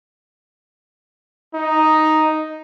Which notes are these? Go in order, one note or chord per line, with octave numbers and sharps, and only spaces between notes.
D#4